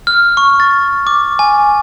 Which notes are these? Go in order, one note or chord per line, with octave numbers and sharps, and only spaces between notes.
F6
C#6
A6
D6
G#5